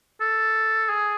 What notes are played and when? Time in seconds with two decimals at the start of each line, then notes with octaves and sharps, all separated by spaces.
0.21 A4
0.89 G#4